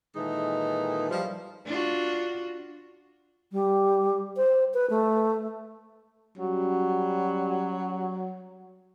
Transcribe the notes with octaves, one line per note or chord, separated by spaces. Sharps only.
A#2 D#3 E3 G#3 D#4 A4
F3 G3
D4 F4 F#4
G3
C5
B4
A3
F#3 G3 C#4 F#4